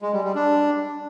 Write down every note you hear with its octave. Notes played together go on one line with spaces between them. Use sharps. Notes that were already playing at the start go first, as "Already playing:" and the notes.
G#3
G3
G3
D4